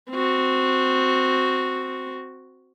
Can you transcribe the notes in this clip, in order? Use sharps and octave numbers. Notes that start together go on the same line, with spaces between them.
C4 F#4